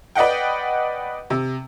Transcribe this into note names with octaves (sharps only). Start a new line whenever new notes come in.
B4 D5 D#5 F#5 G5
C3